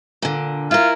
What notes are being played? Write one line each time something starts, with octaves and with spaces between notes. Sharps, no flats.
A#2 D3
E4 F4 A#4